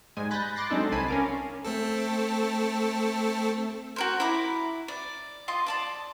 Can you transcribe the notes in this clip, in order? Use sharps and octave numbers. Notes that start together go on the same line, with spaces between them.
G#2 G3 G#3 G#5
B5 F#6 G6 A6 A#6
C6 D6 F#6 A6 A#6 C7
F#3 G#3 C4 D4 D#4 A4
C2 G#5 A5 B5 C7 D#7
C#4 A#4 F5 D6
A3 C4 A4
F#4 A#4 C5
E4 A#5 D6
D5
F4 D#5 C6
D5 A5 D6